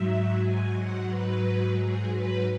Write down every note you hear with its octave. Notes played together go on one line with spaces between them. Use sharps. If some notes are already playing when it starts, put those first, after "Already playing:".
Already playing: G#2 F#3 E5
G#5
F#5
B4
G#4
B4